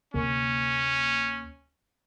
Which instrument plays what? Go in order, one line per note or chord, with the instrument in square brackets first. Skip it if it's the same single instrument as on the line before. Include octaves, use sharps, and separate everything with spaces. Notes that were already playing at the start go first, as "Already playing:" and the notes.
[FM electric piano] D2 C3 A#3 [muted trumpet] C#4